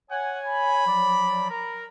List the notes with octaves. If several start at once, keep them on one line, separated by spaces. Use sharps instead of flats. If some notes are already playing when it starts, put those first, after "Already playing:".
C#5 F#5 G#5
B5
F3 F#3 D5
A#4 A#5